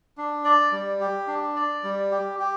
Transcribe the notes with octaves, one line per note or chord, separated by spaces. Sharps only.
D4
D5
G3
G4
D4
D5
G3
G4
G4